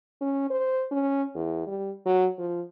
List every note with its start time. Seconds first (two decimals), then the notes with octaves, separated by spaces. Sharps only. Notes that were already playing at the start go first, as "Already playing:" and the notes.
0.21 C#4
0.50 C5
0.91 C#4
1.35 E2
1.67 G3
2.06 F#3
2.39 F3